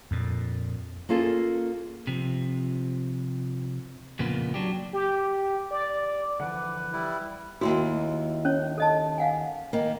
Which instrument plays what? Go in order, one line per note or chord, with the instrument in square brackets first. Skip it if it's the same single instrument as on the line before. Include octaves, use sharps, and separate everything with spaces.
[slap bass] F2 A#2
[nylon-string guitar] A#3 C#4 F4 G#4 A4
[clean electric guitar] C3 F3
F2 A#2 C#3 F3 A#3 B3
F#3 D4 G4
[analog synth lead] G4
D5
[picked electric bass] D3 E3 F3 [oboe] B4 [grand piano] F#5 D6
[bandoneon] G3 E4
[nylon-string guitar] D#2 G#2 E4 [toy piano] F#4 C6
[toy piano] C#4 C#5
A4 D#5 A5
F5 F#5 G#5
[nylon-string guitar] D#3 A#3